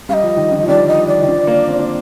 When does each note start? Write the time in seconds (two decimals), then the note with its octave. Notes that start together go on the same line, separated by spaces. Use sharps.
0.09 G3 F5
0.13 D#5
0.23 F3
0.37 D#3
0.51 D3 F3
0.63 F3
0.68 D#3 G3 D5
0.88 D#5
1.07 D5
1.23 D#3
1.27 D3 F3
1.47 A#3 D4
1.68 C4
1.79 D4